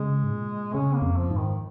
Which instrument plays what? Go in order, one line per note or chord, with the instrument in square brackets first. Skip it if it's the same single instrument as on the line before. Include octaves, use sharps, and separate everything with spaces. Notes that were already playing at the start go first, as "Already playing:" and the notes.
Already playing: [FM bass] C#3 [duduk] G#3
[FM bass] G#2
A#2
[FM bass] C#3 [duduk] C#4
[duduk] A#3
[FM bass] F2
[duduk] F3
[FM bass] G#2
[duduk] D#3